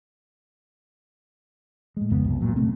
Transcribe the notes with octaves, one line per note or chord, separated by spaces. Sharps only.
A2 G#3
G#1 F2 C#3 B3
C2 F#2
A#2 F#3
C3 A3 C4